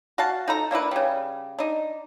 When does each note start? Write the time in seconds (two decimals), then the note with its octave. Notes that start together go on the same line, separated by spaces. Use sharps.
0.18 F#4 F5 A5
0.48 D#4 A4 A#5
0.71 A#3 D4 E4 B4
0.91 C#3 G3
1.58 D4 D#4